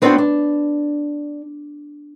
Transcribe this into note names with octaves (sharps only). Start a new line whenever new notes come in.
B3 C4 D4 F#4 A4 C5
D4